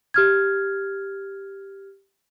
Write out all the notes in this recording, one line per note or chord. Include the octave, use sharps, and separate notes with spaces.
G4 F6 G#6